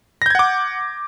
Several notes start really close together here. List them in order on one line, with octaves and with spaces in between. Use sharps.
A#6 G6 G#6 F#5 D6